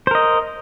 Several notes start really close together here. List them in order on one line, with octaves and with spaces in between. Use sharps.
C5 A#4 D#5